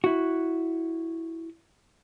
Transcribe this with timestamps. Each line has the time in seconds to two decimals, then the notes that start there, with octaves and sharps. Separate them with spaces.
0.04 E4 F#4